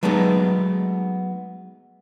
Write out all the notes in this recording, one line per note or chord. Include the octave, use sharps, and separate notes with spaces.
F#3 G#3 A3 B3 D#4